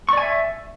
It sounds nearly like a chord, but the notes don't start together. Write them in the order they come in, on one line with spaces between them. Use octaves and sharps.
C#6 D5 G#5 E5